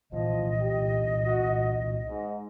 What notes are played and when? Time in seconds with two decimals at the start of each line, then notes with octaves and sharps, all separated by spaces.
0.12 C2 A#2 E3 F3 D#5
0.59 G4
1.25 F#4
2.09 G#2